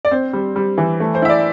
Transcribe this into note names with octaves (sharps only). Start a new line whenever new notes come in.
D5
C4 C5
G3
G3
E3
A3
C5
E4 E5
D5